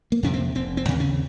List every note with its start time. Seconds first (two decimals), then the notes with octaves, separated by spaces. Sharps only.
0.12 A#3
0.23 F2 C3 C#4
0.34 C4
0.55 F1 C4
0.77 C4
0.88 D#2 C#3
1.00 C#4